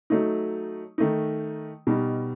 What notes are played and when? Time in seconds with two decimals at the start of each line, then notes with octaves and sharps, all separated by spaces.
0.10 F#3 A3 D#4
0.98 D#3 A3 D#4
1.87 B2 G3 D#4